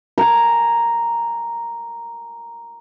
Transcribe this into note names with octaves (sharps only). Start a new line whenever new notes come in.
G#5 A#5